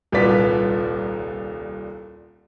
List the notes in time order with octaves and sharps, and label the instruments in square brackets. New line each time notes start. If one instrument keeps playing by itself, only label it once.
[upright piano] D#1 C2 A#2 B4 D5 B6